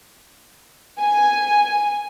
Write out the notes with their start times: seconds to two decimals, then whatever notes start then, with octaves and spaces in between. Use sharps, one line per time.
0.99 G#5